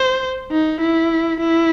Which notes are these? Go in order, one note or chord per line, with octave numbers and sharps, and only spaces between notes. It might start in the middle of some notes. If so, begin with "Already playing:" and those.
Already playing: C5
D#4
E4
E4